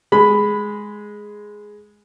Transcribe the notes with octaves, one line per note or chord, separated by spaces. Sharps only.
G#3 B5